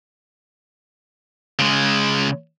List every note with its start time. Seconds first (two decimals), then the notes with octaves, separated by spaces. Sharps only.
1.59 C#3 G#3